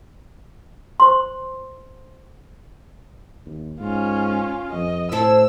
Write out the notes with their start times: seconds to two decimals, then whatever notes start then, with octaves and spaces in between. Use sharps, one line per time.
1.00 C5 C6
3.46 D#2
3.80 G#2 C#4 F4
4.73 F2 D#5
5.12 A2 C4 E4 A4 E6